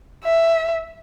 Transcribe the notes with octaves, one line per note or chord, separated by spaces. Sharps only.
E5